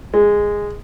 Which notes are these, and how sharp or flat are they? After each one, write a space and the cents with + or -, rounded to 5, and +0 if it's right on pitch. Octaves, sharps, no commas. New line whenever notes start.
G#3 -10